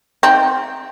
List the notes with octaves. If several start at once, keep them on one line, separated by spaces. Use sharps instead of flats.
C4 D#4